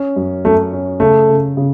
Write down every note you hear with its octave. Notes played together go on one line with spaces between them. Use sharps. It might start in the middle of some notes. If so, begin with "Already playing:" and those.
Already playing: C#4
F#2
F#2 A3
C#4
C#3 A3
C#3
C#3